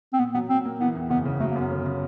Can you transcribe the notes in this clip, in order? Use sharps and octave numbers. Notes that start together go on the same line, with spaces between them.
C4
A#2 B3
F#3 B3
A#2 C4
A#3
E3 B3
E2
F#1 B3
C#3
F#3 A3
A#3
F#2 B3
G1
C#3